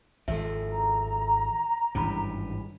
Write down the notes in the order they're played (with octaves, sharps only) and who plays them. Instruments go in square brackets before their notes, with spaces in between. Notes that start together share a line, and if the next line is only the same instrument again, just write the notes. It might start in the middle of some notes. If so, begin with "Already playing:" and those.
[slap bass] G#1 F3 [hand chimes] A4 E5
[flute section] A#5
[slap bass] G#1 G2 E3 [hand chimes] C#4 B5